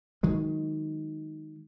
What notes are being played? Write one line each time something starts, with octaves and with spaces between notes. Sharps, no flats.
D#3 F#3 G#3